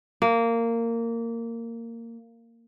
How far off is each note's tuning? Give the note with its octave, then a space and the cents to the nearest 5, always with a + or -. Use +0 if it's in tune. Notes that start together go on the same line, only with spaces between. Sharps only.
A#3 -15